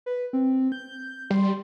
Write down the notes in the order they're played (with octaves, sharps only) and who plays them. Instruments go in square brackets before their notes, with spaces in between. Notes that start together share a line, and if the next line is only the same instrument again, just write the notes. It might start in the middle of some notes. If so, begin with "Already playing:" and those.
[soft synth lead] B4
C4
G6
[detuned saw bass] G3 [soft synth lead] C6